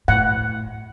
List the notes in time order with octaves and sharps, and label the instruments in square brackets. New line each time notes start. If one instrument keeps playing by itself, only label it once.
[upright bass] A2 [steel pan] F#5